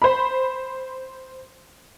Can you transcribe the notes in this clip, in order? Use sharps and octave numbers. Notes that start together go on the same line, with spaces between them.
C5 B5